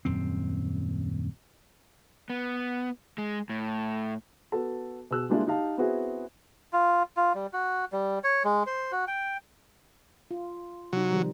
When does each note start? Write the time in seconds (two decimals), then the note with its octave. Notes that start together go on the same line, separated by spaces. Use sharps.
0.05 D#1 F#2 C4
2.30 B3
3.18 G#3
3.49 A2
4.52 B3 F#4 A4 A5
5.11 B2 G#4 E6 F#6
5.29 G3 G#3 A#3 D4 E4 F4
5.47 D#4 G4 F5 A5
5.77 B3 C4 E4 F#4 G#4
6.73 F4
7.17 F4
7.34 G3
7.53 F#4
7.93 G3
8.24 C#5
8.44 G#3
8.67 C5
8.92 F#4
9.08 G5
10.31 F4
10.93 C3 F#3 D#4
11.11 D#3 F3 G3